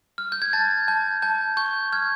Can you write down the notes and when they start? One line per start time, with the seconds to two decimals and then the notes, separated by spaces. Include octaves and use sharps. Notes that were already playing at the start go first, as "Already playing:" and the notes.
0.18 F6
0.32 G6
0.42 G#6
0.53 A5 A6
0.88 A5 G6
1.22 A5 G6
1.57 C#6 G6
1.92 F6 G#6